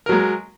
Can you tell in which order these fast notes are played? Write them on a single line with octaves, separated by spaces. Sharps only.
A#4 F#3 G#3